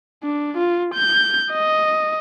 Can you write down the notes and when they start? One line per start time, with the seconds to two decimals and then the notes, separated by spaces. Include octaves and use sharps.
0.23 D4
0.57 F4
0.94 G6
1.52 D#5